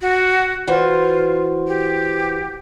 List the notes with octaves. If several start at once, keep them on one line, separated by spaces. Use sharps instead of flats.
F#4
E3 F4 F#4 C5
G4